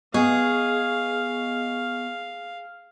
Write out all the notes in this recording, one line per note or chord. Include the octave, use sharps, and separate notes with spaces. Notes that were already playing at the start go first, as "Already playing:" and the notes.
B3 G#4 D#5 F5 C#6